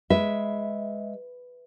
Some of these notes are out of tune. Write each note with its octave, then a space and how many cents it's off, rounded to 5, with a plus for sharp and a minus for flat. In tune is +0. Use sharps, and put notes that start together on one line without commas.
G#3 +0 B4 +5 E5 +0